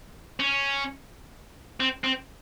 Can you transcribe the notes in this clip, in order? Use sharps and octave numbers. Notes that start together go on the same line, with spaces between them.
C#4
C4
C4